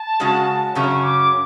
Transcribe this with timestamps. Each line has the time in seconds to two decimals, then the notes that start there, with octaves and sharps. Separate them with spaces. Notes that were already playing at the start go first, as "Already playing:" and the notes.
Already playing: A5
0.20 C#3 G#3 C#4 F#4
0.75 F#2 C#3 F#3 C#4 C#6
1.03 D6